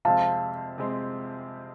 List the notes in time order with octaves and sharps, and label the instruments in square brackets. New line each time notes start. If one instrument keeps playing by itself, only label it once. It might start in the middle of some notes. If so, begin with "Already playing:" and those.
[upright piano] F2 C3 G#3 C4 [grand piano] F5 A5
[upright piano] C3 G#3 C4